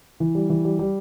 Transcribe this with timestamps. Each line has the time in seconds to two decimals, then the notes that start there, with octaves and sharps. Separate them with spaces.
0.20 E3
0.35 G3
0.50 E3
0.65 G3
0.79 G3